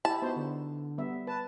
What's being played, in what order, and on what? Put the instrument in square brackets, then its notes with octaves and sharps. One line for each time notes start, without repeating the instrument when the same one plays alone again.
[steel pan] E4 G4 [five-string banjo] A5
[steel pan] B3 D#4 F#4 [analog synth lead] C5
[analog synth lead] D3
[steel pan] G3 B3 E5
[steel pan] B4 [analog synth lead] A5